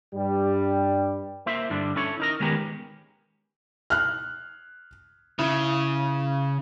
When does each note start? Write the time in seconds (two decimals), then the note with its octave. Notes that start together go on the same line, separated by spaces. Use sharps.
0.13 G2 G3
1.46 A#3 E4 C5 E5
1.70 G2 D3 G3 D4
1.96 C#4 E4 A4 C#5
2.20 D#4 A#4 D#5
2.40 D#3 G#3 B3 C#4 G4 A#4
3.90 F6 F#6
5.39 C#3 E4